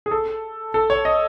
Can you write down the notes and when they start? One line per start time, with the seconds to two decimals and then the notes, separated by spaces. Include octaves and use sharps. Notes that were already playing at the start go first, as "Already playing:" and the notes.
0.06 G#4
0.11 A4
0.74 A4
0.90 C#5
1.05 D#5